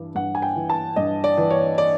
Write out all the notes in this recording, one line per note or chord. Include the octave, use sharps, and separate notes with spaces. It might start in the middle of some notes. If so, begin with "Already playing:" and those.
Already playing: G2 E3
G2 F#5
G#5
G5
E3
A5
G2 D#5
D5
E3
C#5
D5